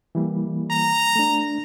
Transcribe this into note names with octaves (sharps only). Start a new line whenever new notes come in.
E3 G3 A#3
A#5
A3 D4